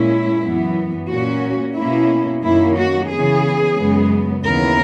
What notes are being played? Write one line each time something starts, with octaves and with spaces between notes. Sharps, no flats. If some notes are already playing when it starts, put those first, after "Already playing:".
Already playing: A#2 G#3 C#4 E4
F#2 E3 B3
A#2 A#3 C#4 F#4
B2 A#3 C#4 E4
F#2 D#3 A#3 C#4 E4
F#4
C#3 E3 B3 G#4
F#2 C#3 G#3 B3
D#2 C#3 E3 B3 A#4